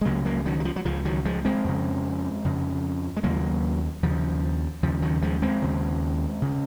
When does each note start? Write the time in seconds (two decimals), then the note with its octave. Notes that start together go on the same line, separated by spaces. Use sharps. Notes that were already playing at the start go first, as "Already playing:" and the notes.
0.01 G#3
0.05 C#2 C#3 F#3 A#3
0.25 F#3 A#3
0.46 D#3 F#3
0.60 F#3
0.65 F3
0.76 F#3
0.85 C#2 C#3 F3
1.05 D#3 F#3
1.25 F3 G#3
1.45 G#3 C4
1.64 F2 C#3
2.45 F2 C#3
3.17 G#3
3.23 D#2 C#3 F#3 A#3
4.03 D#2 C#3 F3
4.83 D#2 C#3 F3
5.02 D#3 F#3
5.22 F3 G#3
5.42 G#3 C4
5.62 D#2 C#3
6.42 C#3